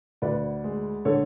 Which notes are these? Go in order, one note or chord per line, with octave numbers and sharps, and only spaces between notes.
D2 B4 D5
G#3
D3 A4 C#5